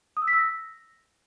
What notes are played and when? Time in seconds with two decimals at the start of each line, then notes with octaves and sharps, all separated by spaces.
0.17 D#6
0.22 E6
0.28 B6
0.33 E6
0.38 A#6